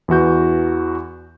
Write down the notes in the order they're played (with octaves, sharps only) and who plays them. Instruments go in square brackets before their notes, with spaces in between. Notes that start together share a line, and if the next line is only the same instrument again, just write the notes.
[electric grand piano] E2 E3 F#4 G6